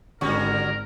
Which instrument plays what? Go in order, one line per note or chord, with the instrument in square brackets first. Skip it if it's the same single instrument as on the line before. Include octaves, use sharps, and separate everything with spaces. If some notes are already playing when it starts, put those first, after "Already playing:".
[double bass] G#1 [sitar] D3 G3 C#4 [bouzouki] F#4 [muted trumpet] A#4